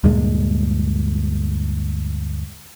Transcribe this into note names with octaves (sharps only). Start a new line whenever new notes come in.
D2 G2 A#2 G#3